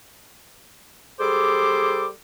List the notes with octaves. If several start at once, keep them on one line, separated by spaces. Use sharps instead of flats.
G3 G#4 A4 C5 D6